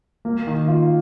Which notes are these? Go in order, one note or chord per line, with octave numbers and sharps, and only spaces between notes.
A#3
D#3
F4